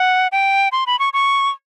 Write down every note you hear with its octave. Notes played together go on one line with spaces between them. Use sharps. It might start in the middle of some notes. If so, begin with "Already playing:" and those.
Already playing: F#5
G5
C6
B5
C#6
C#6